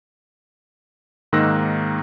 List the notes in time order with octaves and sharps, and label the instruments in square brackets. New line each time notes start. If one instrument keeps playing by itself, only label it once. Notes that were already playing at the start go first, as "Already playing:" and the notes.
[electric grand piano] G#2 D#3 A#3 E6 F#6 A#6